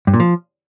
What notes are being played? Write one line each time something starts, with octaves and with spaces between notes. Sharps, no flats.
G2
A#2
F3